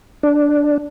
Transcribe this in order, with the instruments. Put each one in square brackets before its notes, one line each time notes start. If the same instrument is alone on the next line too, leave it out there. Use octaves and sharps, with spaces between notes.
[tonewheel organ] D4